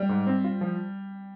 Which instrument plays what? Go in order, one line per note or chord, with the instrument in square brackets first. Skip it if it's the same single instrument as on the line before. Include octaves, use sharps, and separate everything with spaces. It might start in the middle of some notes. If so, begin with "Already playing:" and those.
Already playing: [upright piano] G3
[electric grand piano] G#2
C4
F4
F3